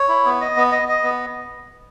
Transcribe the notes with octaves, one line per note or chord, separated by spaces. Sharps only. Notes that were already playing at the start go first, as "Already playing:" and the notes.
Already playing: C#5
E4
B3
D#5
B3
D#5
D#5
B3